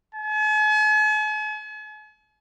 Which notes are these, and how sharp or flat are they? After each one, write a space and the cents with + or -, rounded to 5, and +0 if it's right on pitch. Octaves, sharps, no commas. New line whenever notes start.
G#5 +45